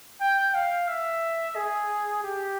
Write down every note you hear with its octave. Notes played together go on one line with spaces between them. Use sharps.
G5
F5
E5
G#4
G4